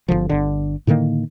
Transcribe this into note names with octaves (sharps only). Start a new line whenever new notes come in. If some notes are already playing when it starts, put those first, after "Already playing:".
G1 D#2 D3 F3
G1 D3
A2 D3 D#3 A#3